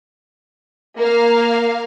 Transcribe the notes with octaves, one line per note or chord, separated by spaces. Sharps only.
A#3 F5